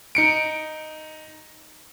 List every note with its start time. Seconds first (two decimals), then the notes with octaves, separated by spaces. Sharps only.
0.15 D#4 C#7 D7